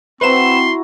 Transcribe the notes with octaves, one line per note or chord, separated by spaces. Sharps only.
C4 E4 F#4 B4 C5 A#5 C6 E7